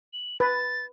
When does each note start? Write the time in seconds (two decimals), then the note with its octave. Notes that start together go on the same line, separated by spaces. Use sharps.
0.13 F#7
0.40 B4 A6